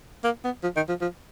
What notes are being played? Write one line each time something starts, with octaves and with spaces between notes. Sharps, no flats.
A#3
B3
F3
D#3
F3
F3